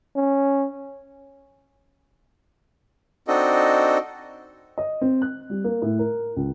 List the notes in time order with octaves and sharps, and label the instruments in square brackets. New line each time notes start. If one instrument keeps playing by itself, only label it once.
[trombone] C#4
[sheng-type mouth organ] C4 D4 D#4 F#4 A4 D#5
[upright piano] D#5
C4
F#6
G3
A#3
A2
A#4
C#2